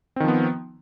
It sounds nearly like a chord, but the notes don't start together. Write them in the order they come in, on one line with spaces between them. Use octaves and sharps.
C4 D#3 F3 B3